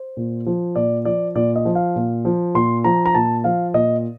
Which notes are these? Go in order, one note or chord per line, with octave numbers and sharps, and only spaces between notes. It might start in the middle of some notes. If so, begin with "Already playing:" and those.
Already playing: C5
A#2
F3
A#2 D5
F3 D5
A#2 D5
D#5
F3
F5
A#2
F3
A#2 C6
F3 A#5
A#5
A#2 A5
F3 F5
A#2 D#5